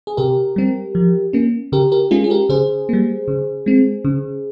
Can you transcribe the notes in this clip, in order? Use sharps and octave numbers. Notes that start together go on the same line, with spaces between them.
G#4
C3 G4 A#4
G3 C4
F3
A#3 C#4
C#3 G4 A#4
G4 A#4
G#3 C#4 F4 G#4
G#4
G4 A#4
C#3 G#4 C5
G3 A#3
C#3
G#3 C4
C#3